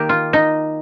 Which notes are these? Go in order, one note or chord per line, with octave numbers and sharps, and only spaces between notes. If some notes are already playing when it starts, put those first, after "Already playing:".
Already playing: D#3 A#3 D#4 G4
F4
D#4